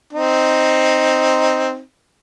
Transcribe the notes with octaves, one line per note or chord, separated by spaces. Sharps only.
C4 D#4